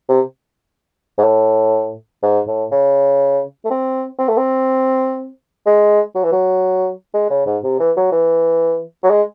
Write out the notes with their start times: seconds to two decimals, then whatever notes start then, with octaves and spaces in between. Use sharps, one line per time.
0.09 C3
1.18 G#2
1.24 A2
2.23 G#2
2.47 A2
2.72 C#3
3.65 A3
3.70 C4
4.19 C4
4.28 A3
4.37 C4
5.66 G#3
6.15 F#3
6.24 E3
6.32 F#3
7.14 G#3
7.30 C#3
7.46 G#2
7.63 C3
7.80 E3
7.97 F#3
8.12 E3
9.03 F#3
9.11 G#3